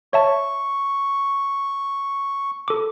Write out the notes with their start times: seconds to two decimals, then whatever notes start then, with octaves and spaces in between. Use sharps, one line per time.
0.13 C#5 E5 A5 C#6
2.68 A4 D6